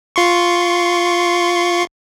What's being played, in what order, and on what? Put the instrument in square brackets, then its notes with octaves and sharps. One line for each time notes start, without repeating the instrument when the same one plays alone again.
[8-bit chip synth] F4 C6 C#6